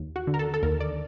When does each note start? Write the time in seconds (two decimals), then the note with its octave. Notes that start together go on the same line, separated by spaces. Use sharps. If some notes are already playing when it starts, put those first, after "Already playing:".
Already playing: D#2
0.16 F#4
0.27 D3
0.34 A#4
0.39 A4
0.54 A4
0.63 D#2 A#4
0.80 D5